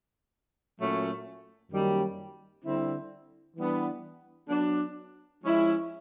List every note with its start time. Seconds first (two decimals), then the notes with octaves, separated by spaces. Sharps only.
0.78 A#2 F#3 A3 C#4
1.70 F#2 D#3 G3 A#3 C#4
2.63 D3 G3 C4 E4
3.56 E3 G3 B3 D4
4.49 F#3 B3 D4
5.42 F3 G#3 C#4 E4